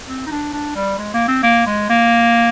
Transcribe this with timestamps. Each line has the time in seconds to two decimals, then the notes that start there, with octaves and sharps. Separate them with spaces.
0.08 C4
0.27 D#4
0.31 D4
0.53 D4
0.76 G3
0.98 G#3
1.14 A#3
1.28 C4
1.43 A#3
1.67 G#3
1.89 A#3